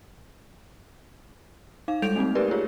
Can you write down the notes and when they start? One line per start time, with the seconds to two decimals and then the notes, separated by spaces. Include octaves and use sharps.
1.88 D#4 F5
2.02 G3 G#3 A4 G6 D7 F7
2.16 A3 A#3 C4 D#4
2.35 G4 A#4 B4 D5
2.51 F4 G4 G#4 C#5